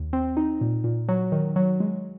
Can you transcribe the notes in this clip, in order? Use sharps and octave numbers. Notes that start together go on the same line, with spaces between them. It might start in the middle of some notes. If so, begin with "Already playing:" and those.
Already playing: D#2
C4
D#4
A#2
A#2
F#3
D#3
F#3
G#3